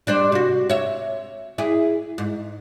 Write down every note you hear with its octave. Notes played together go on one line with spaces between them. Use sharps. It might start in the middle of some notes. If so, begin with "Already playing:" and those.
G3 D4 C5
C3 F#4
C#5 E5
E4 G#4
G#2